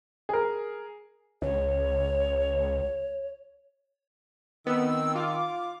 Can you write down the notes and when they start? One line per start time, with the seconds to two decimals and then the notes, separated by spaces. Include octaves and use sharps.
0.29 G#4 A#4
1.42 C#2 C#5
4.67 D#3 B3 C4 E6
5.15 F4 F5 D6